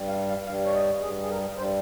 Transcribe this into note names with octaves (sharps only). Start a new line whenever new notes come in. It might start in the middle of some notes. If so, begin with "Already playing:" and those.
Already playing: G2 G3
F5
F5
G2 G3 F5
C#5
D#5
G2 G3 G#4
G#4
A#4
G2 G3 C5